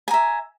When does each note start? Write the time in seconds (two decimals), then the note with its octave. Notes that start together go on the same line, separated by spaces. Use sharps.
0.08 G#5
0.11 A#5
0.14 E5